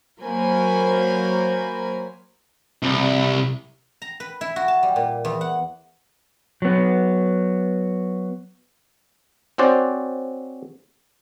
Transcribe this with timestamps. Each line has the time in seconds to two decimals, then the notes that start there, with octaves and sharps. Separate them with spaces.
0.22 F#3 A#3 A#4 C5 G#5 B5
2.83 C2
4.02 A#5
4.20 B4
4.41 E4
4.56 F#4
4.68 A5
4.83 G3
4.96 A#2
5.25 E2
5.41 F#5
6.62 F#3 B3
9.58 C4 C#4 F#4 C5 D5